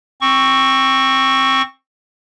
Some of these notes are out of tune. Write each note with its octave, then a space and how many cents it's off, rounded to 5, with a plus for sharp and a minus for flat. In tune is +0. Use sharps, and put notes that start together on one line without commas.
C4 +15 C#6 +0